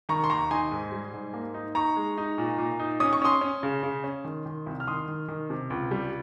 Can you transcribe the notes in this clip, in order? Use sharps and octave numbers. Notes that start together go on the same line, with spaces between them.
D#3 A#5 C#6
C6
D#2 A#5 C#6
D#4 G#5 C6
G#2
G3
G#2
A#3
D#4
D#4 A#5 C#6
G#3
D#4
A#2
A#2
D#4
C#4 D#6
C#6
C#4 C6 D#6
C#4
C#3
C#3
C#4
D#3
D#3
C2
F6
D#3 C6 D#6
D#3
D#3
C3
C#2
G3